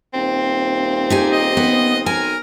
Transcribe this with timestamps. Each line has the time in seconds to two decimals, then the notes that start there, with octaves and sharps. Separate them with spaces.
0.14 D#1 C4
1.10 D#4 G4 G#5
1.33 D#5
1.57 B3
2.06 B1 A#4 G#5